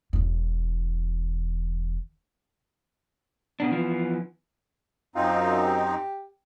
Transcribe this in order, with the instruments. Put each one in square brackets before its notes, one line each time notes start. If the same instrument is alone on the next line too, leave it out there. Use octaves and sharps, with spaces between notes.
[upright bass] E1 E2
[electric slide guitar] B2 D4
E3 F3 B3
[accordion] F#2 C4 D#4 [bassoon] F4
[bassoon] G4